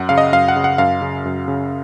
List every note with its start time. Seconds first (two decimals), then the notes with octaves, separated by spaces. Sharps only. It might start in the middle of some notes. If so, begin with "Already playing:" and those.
Already playing: F#2 F#5
0.09 C#3 F5
0.18 D#5
0.32 F#2 F5
0.48 F#5
0.56 C#3
0.64 F#5
0.78 F#2 F5
1.01 C#3
1.25 F#2
1.48 C#3